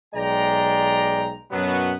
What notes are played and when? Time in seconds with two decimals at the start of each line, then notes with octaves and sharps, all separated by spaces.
0.15 B1 G#3 D5 G5 A#5
1.51 F#2 B2 F#3 B3